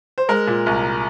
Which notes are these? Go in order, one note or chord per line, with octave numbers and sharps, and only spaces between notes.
C5
G#3 A#4
A#2
C2